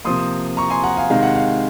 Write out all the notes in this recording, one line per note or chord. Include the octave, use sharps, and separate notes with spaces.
C3 F3 A#3 C6 D#6
A#5 C#6
G#5 C6
F#5 A#5
F5 G#5
C3 D#3 G#3 F5
F#5
F5